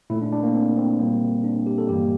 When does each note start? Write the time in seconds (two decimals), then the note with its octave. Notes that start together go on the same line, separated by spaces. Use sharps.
0.10 A#2 A3 E4
0.22 D4
0.32 D4
0.43 A#3
0.55 C4
0.77 C4
0.99 A#2 G3 A#3
1.44 D4
1.67 G4
1.78 A4
1.89 G2 E3 G3 A#3 G4